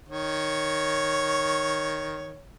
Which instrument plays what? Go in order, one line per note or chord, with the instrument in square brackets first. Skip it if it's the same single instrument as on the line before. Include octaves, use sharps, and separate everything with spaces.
[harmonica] D#3 C#5